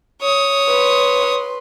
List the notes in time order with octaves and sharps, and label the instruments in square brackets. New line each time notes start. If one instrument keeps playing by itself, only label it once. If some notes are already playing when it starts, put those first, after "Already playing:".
[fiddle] C#5 D#6
[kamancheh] B4 C6